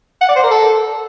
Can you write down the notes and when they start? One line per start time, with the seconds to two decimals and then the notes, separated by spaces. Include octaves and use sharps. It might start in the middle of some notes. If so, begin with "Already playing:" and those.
0.21 F#5
0.29 D5
0.36 C5
0.44 A#4
0.51 A4